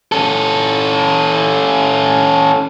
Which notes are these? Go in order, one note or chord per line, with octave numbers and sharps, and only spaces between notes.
C#4 A4